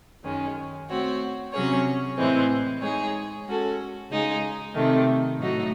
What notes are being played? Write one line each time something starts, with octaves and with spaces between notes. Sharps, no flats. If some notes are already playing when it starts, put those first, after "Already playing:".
F#2 D#3 G#3 C#4
A3 C4 F#4 C#5
C3 F#3 C#4 G#4 C#5
A2 E3 G#3 C4
G#3 D#4 G#4 C#5
G#3 C#4 F#4 A4
C#3 G#3 D#4 G#4
C3 D#3 A3
A2 F#3 A3 D#4 F#4